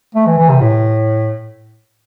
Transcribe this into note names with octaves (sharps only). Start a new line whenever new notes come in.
A3
E3
E3
C3
A2